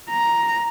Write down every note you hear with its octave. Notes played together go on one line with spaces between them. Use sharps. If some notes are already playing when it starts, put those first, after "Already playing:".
A#5